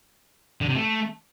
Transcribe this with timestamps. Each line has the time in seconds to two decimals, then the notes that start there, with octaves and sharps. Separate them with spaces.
0.61 D3
0.68 C3
0.75 A3